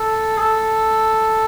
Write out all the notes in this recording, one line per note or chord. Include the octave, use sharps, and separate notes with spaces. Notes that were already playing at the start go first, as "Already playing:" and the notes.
Already playing: A4
G#4
A4